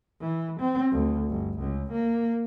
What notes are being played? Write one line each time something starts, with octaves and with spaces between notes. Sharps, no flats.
E3
C4
D2
G1
C#2
A#3